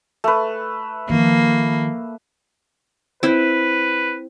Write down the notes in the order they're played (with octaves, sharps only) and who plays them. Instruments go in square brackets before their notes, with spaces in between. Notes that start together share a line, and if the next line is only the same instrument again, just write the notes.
[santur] A3 B4
[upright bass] D#3 F3 [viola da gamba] A#3
[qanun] C4 E4 [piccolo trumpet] B4